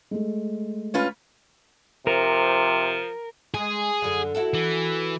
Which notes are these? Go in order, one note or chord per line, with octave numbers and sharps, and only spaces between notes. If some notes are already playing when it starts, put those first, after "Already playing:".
G#3 A3
C#4 F4 B4
C3 F3 A#4
G#3 G#4
F#2 D3
E4 F#4 A4
E3